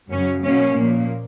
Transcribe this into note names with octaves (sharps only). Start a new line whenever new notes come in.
F#2 C#3 F#3 C#4
B2 F#3 A#3 C#4
A#2 F3 A#3